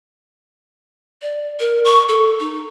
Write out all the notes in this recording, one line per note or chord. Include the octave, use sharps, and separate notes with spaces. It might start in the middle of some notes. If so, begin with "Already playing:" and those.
D5
A#4
C#6
A4
D#4